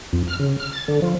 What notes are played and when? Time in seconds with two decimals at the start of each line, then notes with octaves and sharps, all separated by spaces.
0.12 F2
0.28 F6
0.39 C#3
0.59 F6
0.73 A6
0.88 D3
1.02 F3